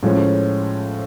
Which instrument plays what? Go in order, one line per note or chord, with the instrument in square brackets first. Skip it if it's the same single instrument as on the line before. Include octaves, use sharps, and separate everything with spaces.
[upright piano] A2 F3 G#3 C#4